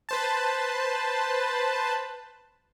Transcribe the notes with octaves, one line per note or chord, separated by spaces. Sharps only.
B4 C5 A5